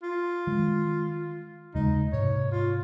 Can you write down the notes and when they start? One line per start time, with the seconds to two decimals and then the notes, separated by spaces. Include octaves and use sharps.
0.03 F4
0.47 D#3 G#3
1.75 D#2 C#3 G#3 D#4
2.13 G#2 C3 C#5
2.52 F4